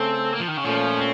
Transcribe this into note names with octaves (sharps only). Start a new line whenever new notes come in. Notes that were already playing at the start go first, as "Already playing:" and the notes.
Already playing: C#3 A3 C4 C#4 A4
A#3
F3
D#3
C#3
A#2 F3 A3 C#4
C4